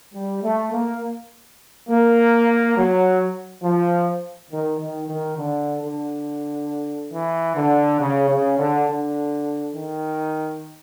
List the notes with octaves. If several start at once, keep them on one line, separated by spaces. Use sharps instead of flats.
G3
A3
A#3
A#3
F#3
F3
D#3
D#3
D#3
D3
D3
E3
D3
C#3
C#3
D3
D3
D#3